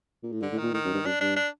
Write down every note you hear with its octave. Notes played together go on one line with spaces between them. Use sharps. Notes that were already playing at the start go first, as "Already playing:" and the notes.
A#2
A2
G2 D3
A2
A#2 D#3
A2 D#3
F#2
G2
F#2 D4
G2 D4
D4